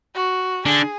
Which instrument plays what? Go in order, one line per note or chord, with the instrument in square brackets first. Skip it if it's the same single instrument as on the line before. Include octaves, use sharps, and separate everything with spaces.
[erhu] F#4
[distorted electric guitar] D3 [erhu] G#4